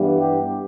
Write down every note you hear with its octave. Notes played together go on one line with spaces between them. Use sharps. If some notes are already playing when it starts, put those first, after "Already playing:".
Already playing: G2 E3 G3 B3
G4